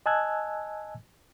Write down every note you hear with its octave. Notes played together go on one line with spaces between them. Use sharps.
D#5 G#5 A5 E6 F#6 G#6